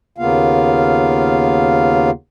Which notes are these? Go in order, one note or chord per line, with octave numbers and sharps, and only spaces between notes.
D#2 C#3 A#3 B3 F4 F5